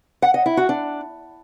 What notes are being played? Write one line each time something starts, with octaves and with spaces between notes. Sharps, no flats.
F#5
D#5
E4
F#4
D4